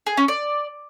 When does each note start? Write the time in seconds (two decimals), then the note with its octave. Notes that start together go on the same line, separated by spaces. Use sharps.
0.06 G#4
0.17 C#4
0.28 D5